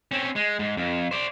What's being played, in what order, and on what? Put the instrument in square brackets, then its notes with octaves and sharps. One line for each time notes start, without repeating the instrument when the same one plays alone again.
[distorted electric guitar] C4 C#4
G#3
G#2
F2
C5 D5